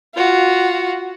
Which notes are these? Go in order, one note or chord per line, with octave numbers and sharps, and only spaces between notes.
F4 F#4